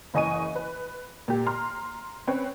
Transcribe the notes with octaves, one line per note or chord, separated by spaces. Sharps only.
F#1 E3 D#5 G#5 C#6 D#7
B4
A#2 G4
A#5 C6 F6
C4 C#4 B4 C#5